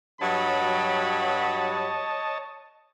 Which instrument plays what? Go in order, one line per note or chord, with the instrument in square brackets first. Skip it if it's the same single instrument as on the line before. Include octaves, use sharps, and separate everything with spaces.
[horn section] G2 F#3 B5 [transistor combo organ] C#5 D#5 A5